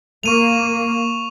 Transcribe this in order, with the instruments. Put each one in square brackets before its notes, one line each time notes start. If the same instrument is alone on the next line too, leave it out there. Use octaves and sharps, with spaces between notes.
[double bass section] A#3 [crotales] C#6 D#7 F7